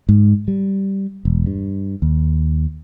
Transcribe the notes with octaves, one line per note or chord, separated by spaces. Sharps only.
G#2
G3
E1
G2
D#2